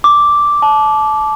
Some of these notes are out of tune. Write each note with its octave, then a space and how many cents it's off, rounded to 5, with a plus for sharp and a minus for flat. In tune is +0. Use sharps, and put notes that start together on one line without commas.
D6 -5
A5 -25